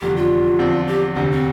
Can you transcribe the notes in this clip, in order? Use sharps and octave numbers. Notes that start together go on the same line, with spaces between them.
F1 E2 D3 G3 G4
F4
E1 E2 D3 F3 C4
G4
E1 D2 C3 D4
C4